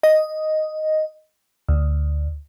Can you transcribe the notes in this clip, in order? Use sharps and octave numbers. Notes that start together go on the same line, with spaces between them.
D#5
D2